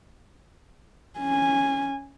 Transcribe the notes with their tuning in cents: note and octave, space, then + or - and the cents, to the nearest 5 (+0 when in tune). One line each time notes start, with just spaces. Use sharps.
C#4 +0 G#5 -10